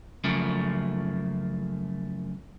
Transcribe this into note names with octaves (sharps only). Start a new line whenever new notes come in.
F#2 C#3 F3 A3 A#3